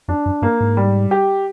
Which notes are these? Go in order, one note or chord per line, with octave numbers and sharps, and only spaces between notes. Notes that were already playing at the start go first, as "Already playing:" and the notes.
F2 D4
F#2
G2 A#3
G#2
G3
G4